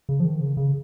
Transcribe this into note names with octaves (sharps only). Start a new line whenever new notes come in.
C#3
F3
D#3
C#3
C#3